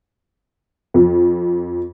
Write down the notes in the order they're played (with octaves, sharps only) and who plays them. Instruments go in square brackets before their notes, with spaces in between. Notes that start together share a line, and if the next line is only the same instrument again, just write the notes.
[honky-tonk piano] F2